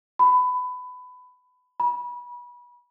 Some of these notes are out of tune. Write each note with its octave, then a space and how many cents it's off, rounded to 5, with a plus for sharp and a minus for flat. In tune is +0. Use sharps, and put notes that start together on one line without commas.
B5 +20
B5 -25